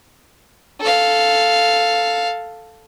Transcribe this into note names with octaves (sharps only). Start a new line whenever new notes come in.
A4 F5